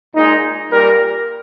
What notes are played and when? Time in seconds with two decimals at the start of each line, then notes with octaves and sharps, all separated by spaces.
0.14 A#2 G#3 D#4
0.71 A#2 G3 A#3 A#4